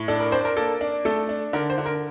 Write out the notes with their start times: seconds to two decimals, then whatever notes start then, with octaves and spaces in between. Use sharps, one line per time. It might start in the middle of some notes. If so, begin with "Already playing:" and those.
Already playing: A2
0.08 D4 A4
0.20 A#4
0.32 D4 C5
0.45 A#4
0.57 A#3 A4
0.81 D4
1.05 A3 A4
1.29 D4
1.53 D3 A#4
1.70 C5
1.78 D3
1.86 A#4